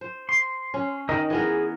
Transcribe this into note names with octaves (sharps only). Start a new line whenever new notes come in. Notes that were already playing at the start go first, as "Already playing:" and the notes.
C5
C6
C#4
D#3 A#4 D#5
E3 B3 G#4 A#4